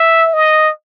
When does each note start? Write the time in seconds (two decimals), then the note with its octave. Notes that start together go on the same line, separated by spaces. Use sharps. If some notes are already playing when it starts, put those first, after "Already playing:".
Already playing: E5
0.33 D#5